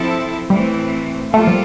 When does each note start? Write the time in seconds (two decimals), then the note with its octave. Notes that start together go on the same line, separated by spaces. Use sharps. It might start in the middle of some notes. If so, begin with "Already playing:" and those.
Already playing: F3 C4 E4 A4
0.50 A2 E3 G3 A3 C4
1.33 G3 A3 A#3 F4 A4
1.47 F3